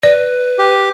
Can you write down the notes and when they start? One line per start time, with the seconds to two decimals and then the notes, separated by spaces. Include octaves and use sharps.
0.03 B4 D5
0.59 G4